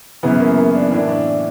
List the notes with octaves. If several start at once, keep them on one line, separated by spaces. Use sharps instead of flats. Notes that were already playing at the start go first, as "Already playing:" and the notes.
F#2 C#3 E3 B3
A#3
A#3
D4
A2 E3 D4
D4